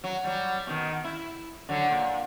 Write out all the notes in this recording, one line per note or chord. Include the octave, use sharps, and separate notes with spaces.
F#3
F#3 G3
B2 D#3
E4
D3 F#3
A#2